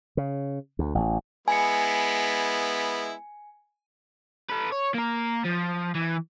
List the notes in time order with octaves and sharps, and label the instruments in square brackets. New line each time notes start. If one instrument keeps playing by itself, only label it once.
[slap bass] C#3
D2
A1
[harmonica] G#3 B3 E4 [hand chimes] G#5 C#7
[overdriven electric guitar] A4 B4
C#5
A#3 A#4
F3
E3